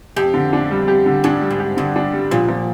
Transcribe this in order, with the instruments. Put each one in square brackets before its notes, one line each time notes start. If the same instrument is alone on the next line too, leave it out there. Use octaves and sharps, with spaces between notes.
[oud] F2 [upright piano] G4
[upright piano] D3
D4
G3
G4
D3
[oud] G2 [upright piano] D4
[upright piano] G3
[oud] G#2
[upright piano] G4
[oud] G2 [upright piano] D3
[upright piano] D4
G3
[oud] A#2 [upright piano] F3
[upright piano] F3